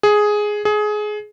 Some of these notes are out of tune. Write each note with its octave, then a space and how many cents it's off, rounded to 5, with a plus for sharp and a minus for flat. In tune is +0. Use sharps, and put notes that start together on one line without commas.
G#4 +5
G#4 +20